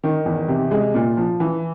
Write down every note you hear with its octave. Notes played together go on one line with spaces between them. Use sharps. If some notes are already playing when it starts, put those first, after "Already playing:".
D#3
E2
C3
G#3
A#2
F3
E3